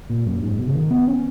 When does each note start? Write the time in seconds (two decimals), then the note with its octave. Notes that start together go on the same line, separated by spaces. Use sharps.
0.10 A#2
0.26 F#2
0.42 G#2
0.59 B2
0.67 C#3
0.75 D#3
0.91 B3
1.07 C#4